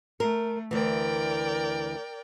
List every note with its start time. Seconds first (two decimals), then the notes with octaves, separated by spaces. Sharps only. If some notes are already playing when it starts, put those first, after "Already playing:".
0.20 A3 A#4
0.71 D2 E3 A#4 D5 G5